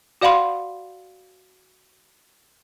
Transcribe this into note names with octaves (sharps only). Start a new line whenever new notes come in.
F#4 D5 F5 F#5 B5 C6